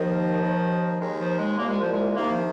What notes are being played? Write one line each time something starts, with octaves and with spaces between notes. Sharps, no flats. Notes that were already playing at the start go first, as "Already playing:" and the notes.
Already playing: D#2 D#3 F3
D#2 D#3
D#2 D#3 G#3
F3
G#3
C2 A#2 A#3
G#3
F3
G#3
C2 C3 D#3 A#3
F3